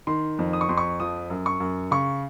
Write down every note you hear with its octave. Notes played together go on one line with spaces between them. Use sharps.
D#3 C6
F2
D#6
C#6
F2 C6
C#6
F3 D#6
F#2
C#6
F#2
C#3 C#6